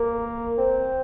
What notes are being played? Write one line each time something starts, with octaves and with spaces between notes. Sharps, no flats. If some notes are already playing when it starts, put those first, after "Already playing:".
Already playing: A#3
C4